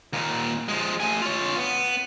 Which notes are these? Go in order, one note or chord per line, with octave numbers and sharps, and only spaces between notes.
D#2 A#2
F3 G#3
A3 G#5
F4 C#5
B3